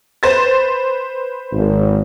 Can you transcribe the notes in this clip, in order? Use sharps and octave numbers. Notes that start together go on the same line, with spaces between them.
B4 C5 A6
G#1